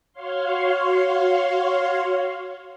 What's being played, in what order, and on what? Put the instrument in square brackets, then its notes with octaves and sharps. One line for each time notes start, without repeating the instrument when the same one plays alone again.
[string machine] F#4 C#5 F5 C6